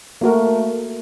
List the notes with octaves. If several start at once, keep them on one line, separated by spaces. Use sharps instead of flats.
A3 A#3 F#4 A#4